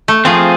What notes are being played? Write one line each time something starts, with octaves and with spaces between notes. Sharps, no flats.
A3
F3 C4 F4 G#4